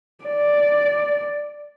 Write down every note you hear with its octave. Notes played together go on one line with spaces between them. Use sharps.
D5